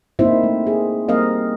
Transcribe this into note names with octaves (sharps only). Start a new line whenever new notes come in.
A#3 C4 D#4 E4 C5 E5
A3
G#4
G3 A#3 C4 A#4 D#5 F5